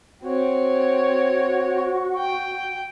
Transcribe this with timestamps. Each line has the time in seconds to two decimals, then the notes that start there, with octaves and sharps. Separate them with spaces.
0.24 C4 F#4 C#5
2.18 G5